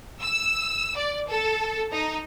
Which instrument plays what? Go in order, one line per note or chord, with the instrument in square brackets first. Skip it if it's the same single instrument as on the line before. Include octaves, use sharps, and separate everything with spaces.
[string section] E6
D5
A4
D#4